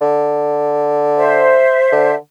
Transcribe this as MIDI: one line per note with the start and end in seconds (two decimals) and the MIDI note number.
0.01 1.62 50
1.17 2.15 72
1.17 2.15 76
1.92 2.15 50